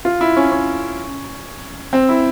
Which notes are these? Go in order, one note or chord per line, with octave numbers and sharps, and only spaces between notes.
F4
E4
C#4
C#4
C4
E4